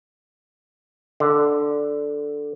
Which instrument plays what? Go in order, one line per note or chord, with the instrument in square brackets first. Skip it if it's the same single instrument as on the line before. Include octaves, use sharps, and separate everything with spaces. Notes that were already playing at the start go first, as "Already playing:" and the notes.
[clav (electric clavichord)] D3